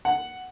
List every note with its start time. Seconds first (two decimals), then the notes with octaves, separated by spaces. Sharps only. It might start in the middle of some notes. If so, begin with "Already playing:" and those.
0.05 F#5